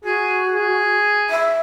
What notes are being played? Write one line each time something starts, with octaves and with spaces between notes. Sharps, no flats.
F#4 G#4
G#4
E5